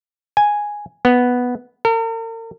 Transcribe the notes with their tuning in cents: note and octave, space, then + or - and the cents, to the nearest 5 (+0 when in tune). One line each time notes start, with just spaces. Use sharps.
G#5 +0
B3 -5
A#4 -45